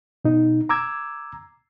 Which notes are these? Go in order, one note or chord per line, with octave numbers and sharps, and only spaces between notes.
B2 D#4
A#5 D6 E6 G#6